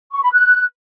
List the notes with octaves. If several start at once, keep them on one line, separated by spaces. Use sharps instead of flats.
C#6
B5
F#6